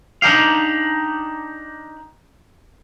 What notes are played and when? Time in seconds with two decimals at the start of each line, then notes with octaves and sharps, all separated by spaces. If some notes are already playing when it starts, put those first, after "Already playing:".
0.22 D4 D#4 G4 F5